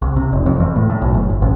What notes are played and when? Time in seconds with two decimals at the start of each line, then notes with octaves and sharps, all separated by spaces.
0.02 C2
0.16 C3
0.33 F1
0.46 F2
0.60 E2
0.76 A2
0.90 A2
1.02 B1
1.14 F#1
1.29 G1
1.42 A1